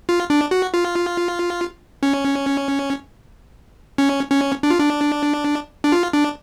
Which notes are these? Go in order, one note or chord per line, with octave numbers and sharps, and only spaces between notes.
F4
D4
F#4
F4
C#4
C#4
C#4
D4
F4
D4
D4
F4
D4